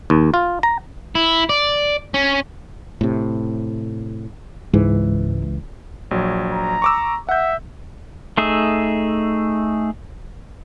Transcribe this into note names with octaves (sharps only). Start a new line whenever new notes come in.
D#2
F4
A#5
E4
D5
C#4
A2 C3
C#2 G#2 E3
A#1 F#3
A#5
C#6 D6 E6
E5 F#5 G6
A3 D#4 G#4 E5